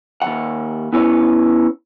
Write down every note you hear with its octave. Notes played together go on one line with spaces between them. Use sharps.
D#2 D#3 F#5
B3 C#4 E4 B4 C#5